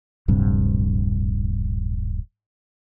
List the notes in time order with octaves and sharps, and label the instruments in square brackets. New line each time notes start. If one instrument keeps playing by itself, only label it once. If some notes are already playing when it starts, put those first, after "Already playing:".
[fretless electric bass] D1 A#1 G2 C3